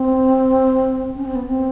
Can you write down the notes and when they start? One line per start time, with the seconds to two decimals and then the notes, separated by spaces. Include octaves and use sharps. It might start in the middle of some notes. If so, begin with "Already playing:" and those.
Already playing: C4
1.15 C#4
1.25 C4
1.36 B3
1.46 C4